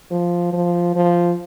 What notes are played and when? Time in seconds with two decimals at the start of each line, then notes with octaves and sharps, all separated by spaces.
0.11 F3
0.53 F3
0.96 F3